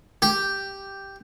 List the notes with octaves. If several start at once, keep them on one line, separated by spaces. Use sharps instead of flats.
G4